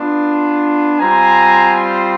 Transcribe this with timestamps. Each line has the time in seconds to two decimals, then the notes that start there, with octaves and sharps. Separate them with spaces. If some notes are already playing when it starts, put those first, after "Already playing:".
Already playing: B3 D4 F4
1.00 G3 C4 F4 G#5 A#5